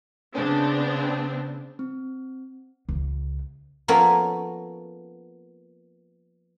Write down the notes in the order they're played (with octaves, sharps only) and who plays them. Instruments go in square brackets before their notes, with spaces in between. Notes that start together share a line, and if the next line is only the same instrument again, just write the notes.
[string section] C#3 B3 C4 D4
[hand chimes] C4
[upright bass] C#2
[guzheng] F3 A#3 B3 C#4 A4 A#4